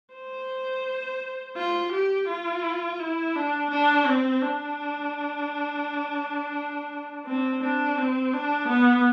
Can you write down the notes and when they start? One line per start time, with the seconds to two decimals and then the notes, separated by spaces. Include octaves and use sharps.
0.15 C5
1.57 F4
1.93 G4
2.29 F4
2.99 E4
3.36 D4
3.71 D4
4.06 C4
4.42 D4
7.26 C4
7.62 D4
7.98 C4
8.33 D4
8.69 B3